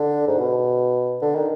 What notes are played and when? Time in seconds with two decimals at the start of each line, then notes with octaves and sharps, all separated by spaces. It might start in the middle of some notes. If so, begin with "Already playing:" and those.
Already playing: D3
0.27 G#2
0.38 B2
1.22 D3
1.35 D#3